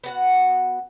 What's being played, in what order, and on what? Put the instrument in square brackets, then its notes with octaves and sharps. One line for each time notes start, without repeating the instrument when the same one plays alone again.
[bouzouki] B3 F#4 F#5